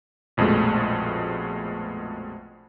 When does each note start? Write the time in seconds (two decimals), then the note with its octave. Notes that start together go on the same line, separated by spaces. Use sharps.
0.37 A#1 F2 B2 G#3 A3